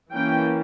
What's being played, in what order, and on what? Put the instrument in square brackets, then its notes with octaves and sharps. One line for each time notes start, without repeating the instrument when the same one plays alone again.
[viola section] E3 A#3 C#4 G5